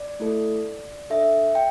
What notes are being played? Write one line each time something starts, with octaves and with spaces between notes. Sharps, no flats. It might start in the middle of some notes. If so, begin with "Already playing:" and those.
Already playing: D5
A3 E4 A4
D4 A4 E5
G5